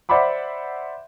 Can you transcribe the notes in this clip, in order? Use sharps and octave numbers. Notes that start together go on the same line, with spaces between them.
C5 D5 E5 F#5 B5 D6